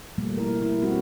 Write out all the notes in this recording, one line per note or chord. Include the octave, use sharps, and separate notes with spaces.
B2 F3 G3 A3 A#3
A#3 E4 A#4
E4
G3 C4 F#4 G4